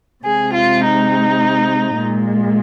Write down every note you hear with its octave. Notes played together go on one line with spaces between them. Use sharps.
C3 G#3 G#4
F4
D#4
A#2 G#3